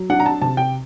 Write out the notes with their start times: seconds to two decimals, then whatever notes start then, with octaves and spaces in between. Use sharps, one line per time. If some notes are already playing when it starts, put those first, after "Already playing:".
Already playing: F#3
0.10 D4 F#5
0.20 A#5
0.26 A5
0.41 C3 A5
0.57 G5